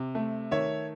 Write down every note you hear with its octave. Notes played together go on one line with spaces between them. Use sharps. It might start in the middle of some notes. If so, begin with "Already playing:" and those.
Already playing: C3
A3
D#3 C#5 E5